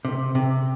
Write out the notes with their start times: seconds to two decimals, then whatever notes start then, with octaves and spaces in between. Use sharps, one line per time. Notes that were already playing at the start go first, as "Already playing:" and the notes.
0.05 C3
0.35 C3